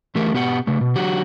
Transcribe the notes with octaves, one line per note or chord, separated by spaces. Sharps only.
E3 A3 G4 A#4
B2 B3 G4 C#5 F#5
C#3 A3
B2
D3 F#3 F#4 G4